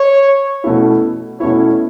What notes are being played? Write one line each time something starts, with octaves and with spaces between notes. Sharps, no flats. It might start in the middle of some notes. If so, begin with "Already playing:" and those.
Already playing: C#5
B2 A3 C#4 E4
B2 A3 C#4 E4 C#5